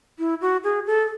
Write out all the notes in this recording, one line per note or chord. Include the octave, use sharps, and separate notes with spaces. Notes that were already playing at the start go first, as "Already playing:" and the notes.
E4
F#4
G#4
A4